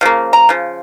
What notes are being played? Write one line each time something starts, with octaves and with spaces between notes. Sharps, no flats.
C#3 F3 A#3
A#5
C#3 F3